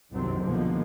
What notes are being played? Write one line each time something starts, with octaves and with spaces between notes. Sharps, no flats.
G1 C2 F#2 C3 D#3 C4
B2 D3 D#3 F3 G#3 A#3